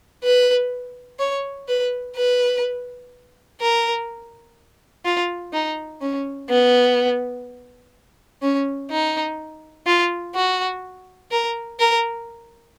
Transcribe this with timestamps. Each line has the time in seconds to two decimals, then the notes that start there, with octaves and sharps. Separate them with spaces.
0.24 B4
1.19 C#5
1.68 B4
2.16 B4
3.61 A#4
5.05 F4
5.53 D#4
6.02 C#4
6.50 B3
8.42 C#4
8.91 D#4
9.87 F4
10.35 F#4
11.31 A#4
11.80 A#4